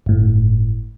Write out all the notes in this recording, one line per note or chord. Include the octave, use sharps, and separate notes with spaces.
G1 A2